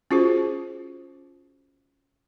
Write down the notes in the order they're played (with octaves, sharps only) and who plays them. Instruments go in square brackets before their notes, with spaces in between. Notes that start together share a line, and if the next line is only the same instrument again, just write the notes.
[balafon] C#4 F4 F#4 G#4 C5